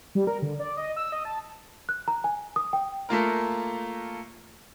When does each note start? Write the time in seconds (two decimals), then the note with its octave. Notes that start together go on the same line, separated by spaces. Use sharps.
0.15 G3
0.27 A#4
0.42 D3
0.60 D5
0.77 D#5
0.96 E6
1.12 D#5
1.25 A5
1.89 F#6
2.08 A#5
2.24 G#5
2.56 D#6
2.73 G5
3.09 A3 A#3 F4 A#4